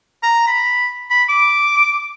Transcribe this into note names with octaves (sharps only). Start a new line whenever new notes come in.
A#5
B5
B5
D6